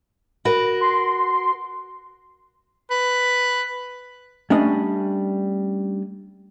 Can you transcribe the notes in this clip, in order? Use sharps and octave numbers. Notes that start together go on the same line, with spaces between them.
F#4 A#4 B4
C6
B4
G3 A3 C#4 D4 D#5